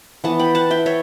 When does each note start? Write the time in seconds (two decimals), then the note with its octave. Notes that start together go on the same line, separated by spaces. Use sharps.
0.24 E3 B3 F#5 A5
0.39 G5 B5
0.55 F#5 A5
0.71 E5 G5
0.86 C#5 E5